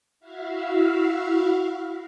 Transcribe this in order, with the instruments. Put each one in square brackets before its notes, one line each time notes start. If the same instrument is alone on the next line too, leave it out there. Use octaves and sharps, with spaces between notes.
[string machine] E4 F#4 E5 F5